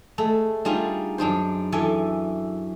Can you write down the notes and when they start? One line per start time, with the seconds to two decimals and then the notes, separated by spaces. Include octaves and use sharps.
0.18 G#3 A3 A4
0.65 G3 D4 D#4 F4 G#4
1.18 F#2 D4 D#4 C5
1.72 F#2 E3 A4 E5 G#5